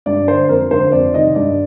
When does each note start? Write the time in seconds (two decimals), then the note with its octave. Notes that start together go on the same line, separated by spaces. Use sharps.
0.06 G2 D5
0.27 D3 C5
0.49 F2 A#4
0.71 D3 C5
0.92 F2 D5
1.14 C3 D#3 D#5
1.35 G2 D5